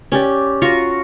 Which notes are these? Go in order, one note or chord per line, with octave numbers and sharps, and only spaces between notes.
C#4 G4 D5
F4 F#4 A#5 C#6